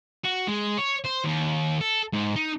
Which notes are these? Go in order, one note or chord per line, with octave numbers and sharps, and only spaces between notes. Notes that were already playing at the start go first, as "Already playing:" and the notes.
F#4
G#3
C#5
C5
D#2
A4
G#2
D#4